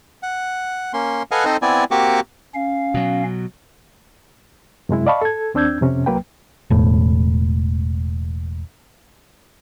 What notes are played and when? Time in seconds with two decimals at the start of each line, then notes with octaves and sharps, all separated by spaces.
0.23 F#5
0.93 A#3 C#4 C6
1.31 A4 B4 D#5 F5 F#5 G#5
1.45 C4 D#4 A4 C5 D#5
1.62 B3 C4 E4 D5 G#5
1.91 A#3 C4 F#4 G4 C#6 D6
2.55 C#4 F5
2.94 B2 F#3
4.89 F#2 C3 G#3 E4
5.07 D5 D#5 F5 A5 B5 C#6
5.21 A4 G#6
5.54 D#2 C4 D4 E6 G6 G#6
5.81 F2 C3 C#4
6.06 C2 F#3 A#3 B4 G5
6.70 E1 A2